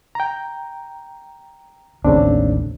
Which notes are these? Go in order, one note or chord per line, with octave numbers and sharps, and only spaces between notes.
G5 A#5
A1 D#2 C#3 C4 D4